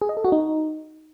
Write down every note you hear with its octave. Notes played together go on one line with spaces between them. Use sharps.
G#4
D#5
A4
F#4
D#4